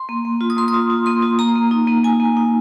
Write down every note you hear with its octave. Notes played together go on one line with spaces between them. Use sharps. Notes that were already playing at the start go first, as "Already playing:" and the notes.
Already playing: C6
A#3
A#3
F4
D#6
A#3 C6
D#6
F4
F4
A#3 C6
F4
A#3 A#5
A#3
D#4
A#3
A#3 G#5
A#3
D#4